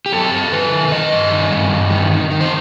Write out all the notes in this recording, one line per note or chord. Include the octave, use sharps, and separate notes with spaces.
G4
F#2 A4
F#2
D#3 B4
D#3
D#3 D#5
G2
D#3
G2
G2
D#3
D#3
D#3
C5